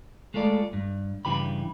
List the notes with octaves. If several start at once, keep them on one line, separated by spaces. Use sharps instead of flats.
G#3 A3 F4 A4 D5
G2
G2 C#3 E3 G4 B5